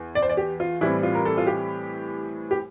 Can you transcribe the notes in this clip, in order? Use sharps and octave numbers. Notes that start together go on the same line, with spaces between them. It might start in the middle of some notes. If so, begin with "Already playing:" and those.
Already playing: E2
D5
C5
D5
G4
F4
A2 E3 G3 C4 E4
F4
A#4
A4
F4
G4
G4